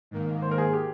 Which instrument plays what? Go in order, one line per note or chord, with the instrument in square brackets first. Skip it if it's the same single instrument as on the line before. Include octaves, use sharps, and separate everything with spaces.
[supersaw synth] G#2 D#3 A#3
[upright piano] C5
A#4
G#4
G4